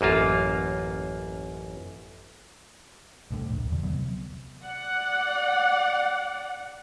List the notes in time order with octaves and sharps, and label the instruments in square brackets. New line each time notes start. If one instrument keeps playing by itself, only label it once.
[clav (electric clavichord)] A1 F#2 A#3 F4
[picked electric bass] C2 A2 D3
D1 A#1
E1 E2 D3
C2 C3 F#3 B3
[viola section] D5 F#5